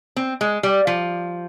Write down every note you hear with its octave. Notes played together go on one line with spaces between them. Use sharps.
C4
G#3
G3
F3